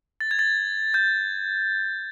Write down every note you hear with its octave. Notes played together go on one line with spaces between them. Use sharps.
A6
G#6
A6
G6